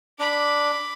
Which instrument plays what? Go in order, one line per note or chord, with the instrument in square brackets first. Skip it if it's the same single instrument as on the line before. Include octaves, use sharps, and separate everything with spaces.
[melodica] D4 [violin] B5 D6